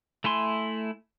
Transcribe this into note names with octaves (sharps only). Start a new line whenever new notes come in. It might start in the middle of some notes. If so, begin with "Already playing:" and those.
A3 E4 G#5 C6